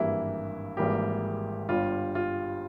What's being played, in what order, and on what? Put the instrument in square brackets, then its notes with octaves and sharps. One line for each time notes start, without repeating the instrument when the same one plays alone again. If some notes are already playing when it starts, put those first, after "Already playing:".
Already playing: [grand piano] G#1 G2 E3 A#3 E4
G#1 G#2 E3 G3 A#3 G4
G1 G2 G3 F4
F4